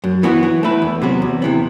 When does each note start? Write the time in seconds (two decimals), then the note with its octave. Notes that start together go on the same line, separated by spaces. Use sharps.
0.04 F#2
0.23 E3 B3 F#4
0.43 E3
0.63 A3 E4 B4
0.82 E2
1.02 C3 F#3 B3 F#4
1.22 E2
1.42 C3 E3 B3